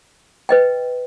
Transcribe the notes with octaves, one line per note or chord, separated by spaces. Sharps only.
B4 D#5 G5